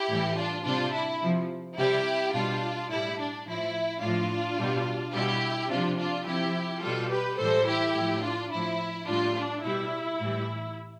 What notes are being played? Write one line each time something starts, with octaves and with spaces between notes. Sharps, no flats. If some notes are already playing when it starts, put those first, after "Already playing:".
Already playing: E4 G4
A2 E3 G3
D4 F4
C3 G3 D4 F4
E4
C3 F3
C3 G3 E4 G4
B2 G3 D4 F4
A2 G3 E4
D4
A2 F3 E4
A2 F3 D4 F4
B2 G3
B2 G3 E4 G4
C3 F3 D4 F4
D4 F4
C3 F3 E4 G4
B2 G3 F4 A4
G4 B4
A2 E3 G3 A4 C5
E4 G4
A2 F3
D4 F4
A2 F3 E4
A2 G3 D4 F4
D4
B2 G3 E4
A2 E3 G3